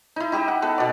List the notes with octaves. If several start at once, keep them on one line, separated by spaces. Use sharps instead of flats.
D#4 E4
D#4 G4 E5 G5
F#5
B3 A4 B4
B2 D5